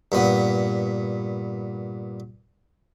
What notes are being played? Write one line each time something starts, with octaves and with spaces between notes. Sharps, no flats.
G2 A#2 B3